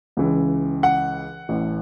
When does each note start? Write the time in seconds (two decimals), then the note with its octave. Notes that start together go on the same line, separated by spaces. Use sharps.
0.17 C#2 C#3 E3
0.83 F#5
1.49 A1 A2 E3